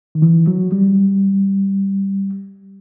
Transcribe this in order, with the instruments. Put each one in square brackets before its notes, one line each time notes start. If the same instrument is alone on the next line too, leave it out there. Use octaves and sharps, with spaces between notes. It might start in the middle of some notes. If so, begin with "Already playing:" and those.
[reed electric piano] D#3
E3
F#3
G3